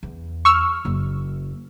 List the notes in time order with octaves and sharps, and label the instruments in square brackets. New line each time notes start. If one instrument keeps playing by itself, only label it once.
[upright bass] E2
[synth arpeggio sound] C#6 E6 F6
[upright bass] F#1